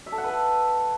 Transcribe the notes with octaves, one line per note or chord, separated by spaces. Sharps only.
E5
A4
F#5
B4
A4